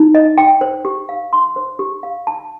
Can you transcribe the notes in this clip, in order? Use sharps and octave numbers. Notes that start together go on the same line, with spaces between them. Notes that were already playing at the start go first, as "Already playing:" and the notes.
Already playing: D#4
D#5
G5
C5
G4
F5
C6
C5
G4
F5
A5